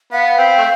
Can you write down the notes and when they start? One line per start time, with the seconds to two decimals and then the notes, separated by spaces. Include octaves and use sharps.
0.12 B3 F5
0.38 C4
0.58 A3